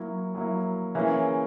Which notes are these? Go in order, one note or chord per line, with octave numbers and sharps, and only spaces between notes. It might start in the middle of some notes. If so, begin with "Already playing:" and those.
Already playing: F#3 A#3 E4
F#3 A#3 E4
C#3 E3 A#3 C#4 E4